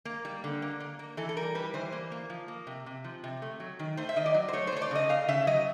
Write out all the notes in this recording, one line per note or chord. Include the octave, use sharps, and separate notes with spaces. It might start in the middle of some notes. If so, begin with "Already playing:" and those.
A#3
G3
D3
A#3
A#3
A#3
E3 A4
A4
G3 A#4
G3 B4
E3 C5
A#3
A#3
F3
A#3
C3
C3
F3
C3
A3
F#3
D#3
A3 C5
E5
D#3 D#5
D5
F#3
C5
A3 C#5
C5
A3 C#5
D5
C#3 D#5
C#3 F5
C#3 E5
F#3 D#5